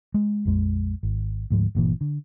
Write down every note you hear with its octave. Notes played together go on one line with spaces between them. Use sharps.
G#3
A#1 F2 G#3
G#1
D2 G#2 F3
G1 A#2 E3
D3